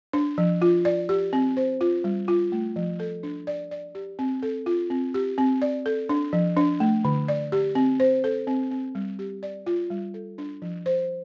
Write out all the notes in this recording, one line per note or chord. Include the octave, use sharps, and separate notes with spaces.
D4
F3
F4
D5
G4
C4
C5
F4
G3
F4
A3
F3
A4
D4
D5
D5
G4
C4
A4
F4
C4
G4
C4
D5
A4
D4
F3
D4
A3
D3
D5
G4
C4
C5
A4
C4
C4
G3
G4
D5
F4
G3
A4
D4
F3
C5